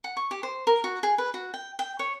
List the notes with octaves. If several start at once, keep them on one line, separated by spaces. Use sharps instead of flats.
F#5
C#6
G4
C5
A#4
F#4
G#4
B4
F#4
G5
G5
C#5